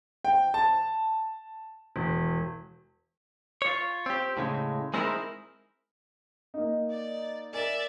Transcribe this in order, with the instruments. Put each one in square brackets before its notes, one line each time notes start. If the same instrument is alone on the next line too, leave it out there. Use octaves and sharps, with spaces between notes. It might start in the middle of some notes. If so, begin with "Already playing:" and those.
[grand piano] G5
A5
E1
[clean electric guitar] F4 C#5
C4 G4
A2 C#3 G#3
G#3 C4 D#4 E4 A4 A#4
[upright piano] A#3 D#4
[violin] D5
[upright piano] A#4 G#5 [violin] D5 E5